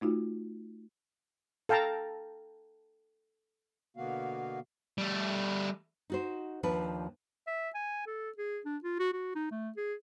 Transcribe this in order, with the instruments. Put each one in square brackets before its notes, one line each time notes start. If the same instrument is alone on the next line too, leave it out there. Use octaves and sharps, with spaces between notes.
[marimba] A3 D#4 F4 F#4
[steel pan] A4 F5 G5 A5 A#5
[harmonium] B2 D3 A#3 B3 F#4 F5
[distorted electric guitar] G3 A3
[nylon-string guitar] D#4 F#4 C5
D#2 F3 D4 B4
[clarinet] E5
G#5
A4
G#4
D4
F4
F#4
F#4
D#4
A3
G#4